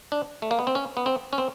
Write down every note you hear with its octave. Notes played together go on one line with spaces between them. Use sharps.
D4
A3
A#3
B3
C4
C#4
B3
C4
C#4
C4